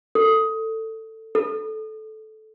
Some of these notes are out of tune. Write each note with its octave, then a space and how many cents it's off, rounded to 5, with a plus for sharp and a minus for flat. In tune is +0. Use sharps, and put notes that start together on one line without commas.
A4 +15
A4 -15